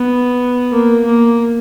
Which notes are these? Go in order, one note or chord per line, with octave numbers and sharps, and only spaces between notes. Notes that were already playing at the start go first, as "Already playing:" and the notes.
Already playing: B3
A#3
A#3